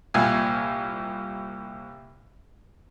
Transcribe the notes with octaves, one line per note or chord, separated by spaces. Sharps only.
C2 A#2 G#5